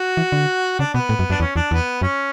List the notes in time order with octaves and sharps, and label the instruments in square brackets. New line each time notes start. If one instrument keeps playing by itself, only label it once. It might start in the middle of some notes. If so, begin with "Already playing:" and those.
Already playing: [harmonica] F#4
[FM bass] E3
D3
[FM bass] C#3 [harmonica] D4
[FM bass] B2 [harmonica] B3
[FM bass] A2
F#2
[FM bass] F#2 [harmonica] D4
[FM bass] E2 [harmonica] C#4
[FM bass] E2 [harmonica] D4
[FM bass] E2 [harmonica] B3
[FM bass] F#2 [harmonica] C#4